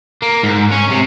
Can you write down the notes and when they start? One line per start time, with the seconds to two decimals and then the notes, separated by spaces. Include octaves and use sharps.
0.22 A#3
0.43 G#2
0.72 C#4
0.90 C3